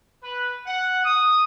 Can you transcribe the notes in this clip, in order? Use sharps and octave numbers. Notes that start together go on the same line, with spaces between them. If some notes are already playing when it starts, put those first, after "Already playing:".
B4
F#5
D#6